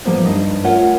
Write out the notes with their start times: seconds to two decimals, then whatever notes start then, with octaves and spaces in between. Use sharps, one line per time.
0.05 A2 F3 G3 A#3 B3 C5
0.25 G2 D#4 D#5
0.64 A3 C#4 F4 A#4 C#5 F#5